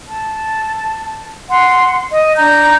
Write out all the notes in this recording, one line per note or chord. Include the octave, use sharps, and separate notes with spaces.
A5
F#5 C6
D#5
D4 A#5 G6